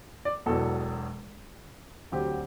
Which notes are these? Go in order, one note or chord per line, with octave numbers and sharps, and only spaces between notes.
D5
E1 E2 B2 F#3 A4
D2 D3 F#3 C4 G4